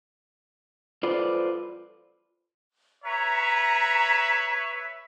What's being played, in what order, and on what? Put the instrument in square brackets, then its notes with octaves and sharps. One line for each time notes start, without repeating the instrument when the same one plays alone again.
[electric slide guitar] F4 A4 B4 C5 D5
[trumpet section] B4 C#5 E5 [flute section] A#5